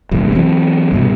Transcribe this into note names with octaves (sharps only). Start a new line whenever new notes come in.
F1 A#1 E2 G2
E3 F#3 C4
C2 G2 B2